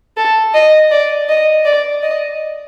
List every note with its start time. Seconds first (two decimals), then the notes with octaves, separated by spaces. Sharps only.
0.17 A4
0.54 D#5
0.91 D5
1.29 D#5
1.65 D5
2.03 D#5